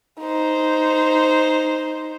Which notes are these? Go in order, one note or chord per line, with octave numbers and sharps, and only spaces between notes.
D#4 C5